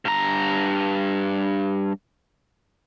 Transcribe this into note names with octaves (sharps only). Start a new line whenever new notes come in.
G2 A#5